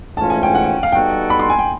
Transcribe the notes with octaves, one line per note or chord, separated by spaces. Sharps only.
G#2 E3 A3 C#4 F4 A5
G#5
G5
F#5
G5
F5
G3 B3 D#4 F#4 A4 G5
B5
C6
G#5
G5